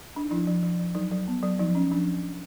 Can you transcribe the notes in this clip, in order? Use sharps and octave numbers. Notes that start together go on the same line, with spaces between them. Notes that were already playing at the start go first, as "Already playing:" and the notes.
D4
D#4
F3 D4 E4
F3
F3
F3
F#3 D#4
F#3
B3
F#3
F3 D#4
C#4
F3 D4